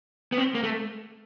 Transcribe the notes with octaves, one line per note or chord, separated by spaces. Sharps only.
B3
C4
A#3
A3